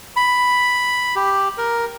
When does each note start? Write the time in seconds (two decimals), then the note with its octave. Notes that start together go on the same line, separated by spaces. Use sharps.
0.16 B5
1.16 G4
1.58 A#4